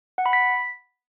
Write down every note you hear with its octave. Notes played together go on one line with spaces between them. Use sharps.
F#5
B5
B6